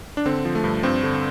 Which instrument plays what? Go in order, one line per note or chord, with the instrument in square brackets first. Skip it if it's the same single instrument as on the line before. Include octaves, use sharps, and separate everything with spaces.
[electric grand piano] D4
D3 C4
F3
A3
G2
G2 C4
D3